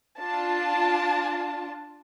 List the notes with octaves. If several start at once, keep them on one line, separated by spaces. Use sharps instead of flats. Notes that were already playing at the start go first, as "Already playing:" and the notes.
D4 F4 A5